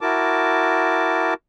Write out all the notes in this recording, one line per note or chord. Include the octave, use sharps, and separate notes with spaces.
E4 F#4 A#4 A5 D6